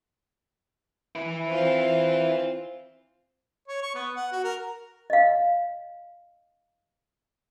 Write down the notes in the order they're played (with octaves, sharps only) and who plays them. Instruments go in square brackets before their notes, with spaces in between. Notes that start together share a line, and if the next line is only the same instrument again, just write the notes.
[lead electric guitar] E4 B4
[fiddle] C4 F4
[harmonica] C#5
C#6
B3
F#5
F#4
A#4
[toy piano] D#5 F5